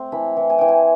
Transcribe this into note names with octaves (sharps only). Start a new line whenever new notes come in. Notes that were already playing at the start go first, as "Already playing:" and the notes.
Already playing: A3 C4
E3 B5
E3
G#5
E3 G5
G#5